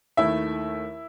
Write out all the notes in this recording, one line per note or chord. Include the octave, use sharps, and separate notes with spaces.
D#2 D#3 A3 E4 E5